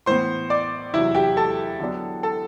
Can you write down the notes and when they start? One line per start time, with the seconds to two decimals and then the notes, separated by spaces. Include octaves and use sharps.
0.06 A2 E3 B3 C5 C6
0.50 D5 D6
0.94 E2 C3 F#3 E4 E5
1.15 G4 G5
1.37 A4 A5
1.79 D3 F#3 B3 D4
2.23 A4 A5